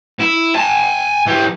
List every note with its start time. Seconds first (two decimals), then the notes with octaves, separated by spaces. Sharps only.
0.20 E4
0.55 G#5 A5
1.26 E3 G4